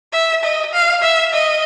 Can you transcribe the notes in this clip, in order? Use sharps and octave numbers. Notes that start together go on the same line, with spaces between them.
E5
D#5
F5
E5
D#5